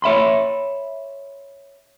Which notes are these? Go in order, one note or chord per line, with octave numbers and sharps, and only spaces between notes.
C#5 E5 B5 C6